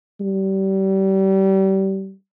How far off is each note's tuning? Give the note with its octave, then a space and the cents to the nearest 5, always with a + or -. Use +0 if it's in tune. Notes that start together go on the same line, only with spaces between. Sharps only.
G3 -30